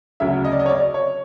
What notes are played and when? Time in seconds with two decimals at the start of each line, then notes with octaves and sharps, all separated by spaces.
0.20 D2 C#3 F#3 E5
0.45 D#5
0.52 D5
0.60 D#5
0.66 C#5
0.69 D5
0.94 C#5